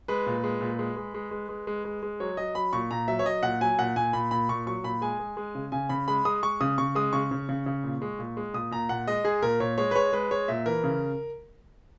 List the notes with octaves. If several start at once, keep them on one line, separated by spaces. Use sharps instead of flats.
G#3 B4
A#2
G#3
A#2
G#3
G#3
G#3
G#3
G#3
G#3
G#3
G#3
F#3 C#5
F#3 D#5
F#3 B5
A#2 C#6
A#2 A#5
F#3 E5
C#5
F#3 D#5
A#2 F#5
F#3 G#5
A#2 F#5
A#2 G#5
A#2 B5
A#2 B5
A#2 C#6
F#3 C#6
A#2 B5
G#3 G#5
G#3
G#3
C#3
C#3 G#5
C#3 B5
G#3 B5
G#3 D#6
G#3 C#6
C#3 D#6
C#3 C#6
G#3 D#6
C#3 C#6
C#3
C#3
C#3
A#2
G#3
A#2
G#3
A#2 D#6
A#2 A#5
A#2 F#5
G#3 D#5
G#3 G#4
A#2 A#4
A#2 C#5
G#3 C#5
B4
G#3 C#5
G#3 B4
G#3 C#5
A#2 E5
E3 A#4
C#3